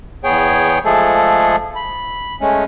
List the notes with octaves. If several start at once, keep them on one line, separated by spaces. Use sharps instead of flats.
E2 B3 G#4 C#5 G5
F3 G#3 A3 G#4 A4
B5
G#3 A3 C#4